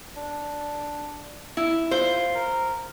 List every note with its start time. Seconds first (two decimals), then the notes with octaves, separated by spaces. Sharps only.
0.17 D4
1.57 E4
1.91 F4 C5
2.35 A#4